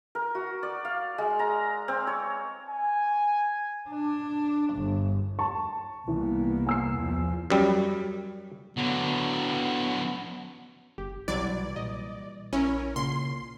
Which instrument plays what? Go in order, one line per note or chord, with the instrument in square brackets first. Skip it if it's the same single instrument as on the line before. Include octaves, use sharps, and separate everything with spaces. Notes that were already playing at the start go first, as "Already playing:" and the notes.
[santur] A#4
F#4
D5
F5
G#3
A#5
C4
C#5
[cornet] G#5
[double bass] D4
G1
[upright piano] A5 C#6
[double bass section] C2 A#3 B3 [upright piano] E3
[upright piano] G#5 E6 C7
[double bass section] E2 F3
[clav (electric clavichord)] F#2 G3
[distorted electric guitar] D3 F#3 [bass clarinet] B3
[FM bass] F#1 [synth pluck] G4
[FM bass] B1 [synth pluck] C3 F#3 G#6 [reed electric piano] E3 G3 B4 [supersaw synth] D5
[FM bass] A#2 [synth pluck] D#5
[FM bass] A#1 [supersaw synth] C#4 [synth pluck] E4 A#4
[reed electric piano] C#2 A#2 [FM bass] C#3 [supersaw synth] C6